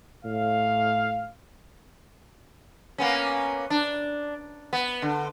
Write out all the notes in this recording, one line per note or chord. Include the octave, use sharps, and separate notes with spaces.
A2 F5
A#3 B3 C#4
D4
B3
D3